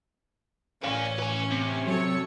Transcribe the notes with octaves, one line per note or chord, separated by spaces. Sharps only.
A1 C#4 D5 F5
B4 G#5
C3
F#3 A4 C#5